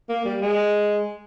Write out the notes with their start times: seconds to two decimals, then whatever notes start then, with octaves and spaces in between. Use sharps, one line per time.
0.09 A#3
0.25 G3
0.41 G#3